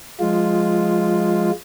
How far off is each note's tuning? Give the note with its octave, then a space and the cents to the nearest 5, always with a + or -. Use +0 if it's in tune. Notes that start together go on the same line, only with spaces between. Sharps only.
F3 +25 G#3 +0 F4 +0